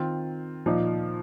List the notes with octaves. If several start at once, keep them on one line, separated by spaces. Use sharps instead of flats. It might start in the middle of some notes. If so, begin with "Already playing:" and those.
Already playing: D#3 C4 F4
A#2 F3 D#4